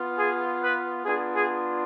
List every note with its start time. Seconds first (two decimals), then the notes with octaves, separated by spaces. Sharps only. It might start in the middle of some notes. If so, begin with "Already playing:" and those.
Already playing: B3 F4
0.16 G#4
0.60 B4
1.05 B3 D4 F4 G#4
1.35 G#4